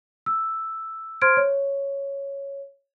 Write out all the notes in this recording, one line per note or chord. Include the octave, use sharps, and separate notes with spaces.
E6
C5 C6 F6 G#6 D7
C#5